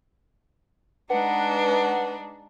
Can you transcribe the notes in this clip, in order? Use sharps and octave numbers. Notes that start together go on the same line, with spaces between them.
G#3 D4 D#4 B4 F#5